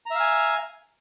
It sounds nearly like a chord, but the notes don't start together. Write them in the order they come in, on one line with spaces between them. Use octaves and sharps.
A#5 E5 F5 G#5